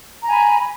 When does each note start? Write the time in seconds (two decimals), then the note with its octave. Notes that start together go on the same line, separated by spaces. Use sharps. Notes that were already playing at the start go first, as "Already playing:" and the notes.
0.22 A#5
0.27 G#5
0.31 B5